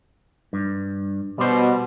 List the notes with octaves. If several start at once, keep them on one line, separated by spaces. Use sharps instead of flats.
G2
B2 G3 C5